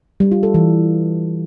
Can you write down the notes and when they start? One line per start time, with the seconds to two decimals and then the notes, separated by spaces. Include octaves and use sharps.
0.20 G3
0.32 F4
0.43 A4
0.54 E3